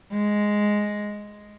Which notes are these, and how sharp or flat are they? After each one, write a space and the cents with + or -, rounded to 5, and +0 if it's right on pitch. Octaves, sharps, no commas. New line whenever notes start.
G#3 +0